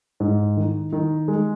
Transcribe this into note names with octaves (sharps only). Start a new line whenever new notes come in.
G#2
D#3
D#3
G#3